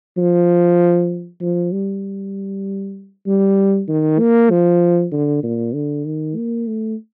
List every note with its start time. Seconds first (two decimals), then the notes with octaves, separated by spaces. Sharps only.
0.17 F3
1.41 F3
1.72 G3
3.26 G3
3.88 D#3
4.20 A#3
4.51 F3
5.12 D3
5.43 A#2
5.74 D3
6.05 D#3
6.36 A#3
6.67 A3